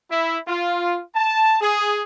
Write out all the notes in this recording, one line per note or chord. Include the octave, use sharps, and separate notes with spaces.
E4
F4
A5
G#4